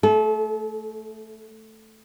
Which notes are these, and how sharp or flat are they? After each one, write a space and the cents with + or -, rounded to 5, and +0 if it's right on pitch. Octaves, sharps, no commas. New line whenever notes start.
A3 +0 A4 -35